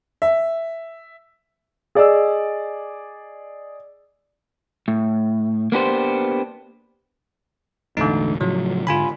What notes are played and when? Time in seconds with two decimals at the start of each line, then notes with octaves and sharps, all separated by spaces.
0.22 E5
1.95 G#4 D5 D#5 E6
4.88 A2
5.72 A#3 B3 D4 G4 C5
7.97 E1 A1 D3 A3 D#4
8.41 A2 C#3 F3 F#3
8.87 G#2 D3 F4 G#5 B5